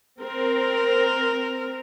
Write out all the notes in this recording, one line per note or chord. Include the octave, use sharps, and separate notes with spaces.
C4 A#4